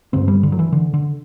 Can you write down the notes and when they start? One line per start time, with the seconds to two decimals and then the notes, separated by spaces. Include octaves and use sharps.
0.13 G2 D3 C4
0.28 G3
0.43 D3
0.52 F#3
0.59 E3
0.73 D3
0.94 D3